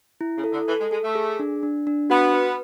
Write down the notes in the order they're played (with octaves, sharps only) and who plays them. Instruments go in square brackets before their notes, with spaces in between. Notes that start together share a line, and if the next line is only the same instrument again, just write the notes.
[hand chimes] E4
[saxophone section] C#3
[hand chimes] A4
[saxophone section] D3
[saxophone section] E3 [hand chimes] A4
[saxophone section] G#3
[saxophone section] G#3 [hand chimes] A4
[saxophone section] A3
[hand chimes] G#4
D4
D4
D4
[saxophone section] B3 [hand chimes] F#4
[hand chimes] B4